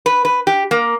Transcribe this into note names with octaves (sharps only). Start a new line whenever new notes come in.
B4
B4
G4
A#3